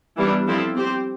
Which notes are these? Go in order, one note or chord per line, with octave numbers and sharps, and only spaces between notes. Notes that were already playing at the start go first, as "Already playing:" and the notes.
E3 G3 B3 D4
F3 C4 E4 A4
C4 G4 C5